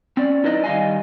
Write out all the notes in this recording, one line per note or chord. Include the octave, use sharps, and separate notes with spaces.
C4 C#4 D5
D#4 E4 B4 D5 D#5
D#3 G3 F4 D#5 F5 G#5